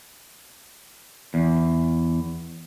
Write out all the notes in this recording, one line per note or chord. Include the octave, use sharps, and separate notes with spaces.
E2